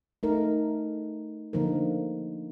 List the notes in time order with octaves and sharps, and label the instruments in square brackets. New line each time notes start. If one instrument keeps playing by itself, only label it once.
[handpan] A3 D#4 A#4
D3 F3 A#3 D#4 A#4